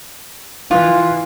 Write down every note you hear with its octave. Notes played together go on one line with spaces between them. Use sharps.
E3 F4